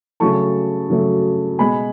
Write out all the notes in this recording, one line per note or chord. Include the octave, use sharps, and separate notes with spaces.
C#3 F#3 A3 A5 C#6
C#3 F#3 A3
B2 G#3 G#5 B5